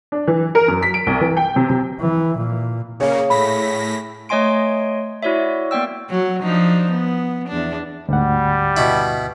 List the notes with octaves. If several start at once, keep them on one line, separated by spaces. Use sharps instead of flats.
D4
E3
A#4
F#2
B6
D7
C2
E3
G5
C3
C3
E3
A#2
C#3 A#3 G#4 C#5 F5
A2 B5 A#6 B6
A3 C#5 D#5 G#5 C6 D7
E4 F#4 C#5 D5 E5
A#3 B3 D5 G5 E6
F#3
F3 D4 D#4
B3
E2 D4
D2 G#2 G3 F#5
B2 E4